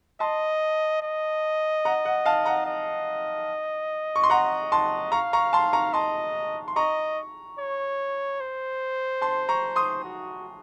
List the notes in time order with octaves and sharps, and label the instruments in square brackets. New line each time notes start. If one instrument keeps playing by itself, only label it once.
[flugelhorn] D#5 [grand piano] A5 C6
[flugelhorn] D#5
[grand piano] F#5 A#5
F#5
F5 A5
F#5 A#5
[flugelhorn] D#5
[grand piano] C#6
C6
F#5 A#5
A5 C6
[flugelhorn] F5 [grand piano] A#5 C#6
[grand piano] A#5 C#6
A5 C6
A#5 C#6
[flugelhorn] D#5 [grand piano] A5 C6
[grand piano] C6
[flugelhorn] D#5 [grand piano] A#5 C#6
[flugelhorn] C#5
C5
[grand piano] A5 C6
A#5 C#6
C6 D#6
[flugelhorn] F#4